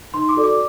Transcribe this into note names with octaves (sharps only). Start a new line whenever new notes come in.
D#4 C6
D6
F#4 A4 D5
D6